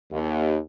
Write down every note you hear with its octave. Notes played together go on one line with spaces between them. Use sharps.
D#2